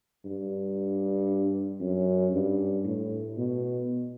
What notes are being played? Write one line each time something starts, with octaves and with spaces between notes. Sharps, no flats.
G2
F#2
G2
A2
B2